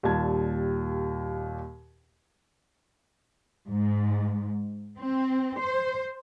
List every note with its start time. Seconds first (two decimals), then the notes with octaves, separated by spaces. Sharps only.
0.03 D#2 A#2 G3 A5 G#6
3.69 G#2
4.98 C4
5.58 C5